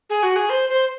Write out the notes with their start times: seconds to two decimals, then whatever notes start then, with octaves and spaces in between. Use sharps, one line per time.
0.10 G#4
0.23 F#4
0.36 G#4
0.50 C5
0.69 C5